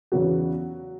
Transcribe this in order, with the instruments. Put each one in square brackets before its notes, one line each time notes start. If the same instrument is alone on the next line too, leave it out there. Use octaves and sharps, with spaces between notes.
[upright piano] E2 C#3 E3 F#3 F#4